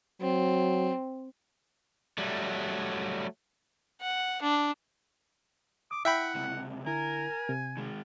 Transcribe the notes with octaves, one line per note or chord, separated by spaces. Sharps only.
F#3 C4
F#3 G3 A3
F#5
D4
D6 D#6
E4 E5 F#5 G5 B5
C#2 C3
D3 E4 A#4 G#5
C3
D#3 G#3